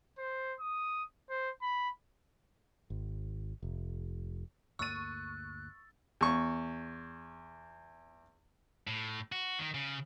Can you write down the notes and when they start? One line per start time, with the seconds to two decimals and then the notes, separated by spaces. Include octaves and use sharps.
0.18 C5
0.60 D#6
1.30 C5
1.62 B5
2.90 G#1
3.63 F1
4.79 D2 G2 A#3 C#6 E6 F#6 A6 D#7
6.21 E2 C#6
8.87 A2
9.32 F#4
9.59 D#3
9.74 C#3